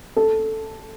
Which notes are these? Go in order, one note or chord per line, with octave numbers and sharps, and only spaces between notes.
A4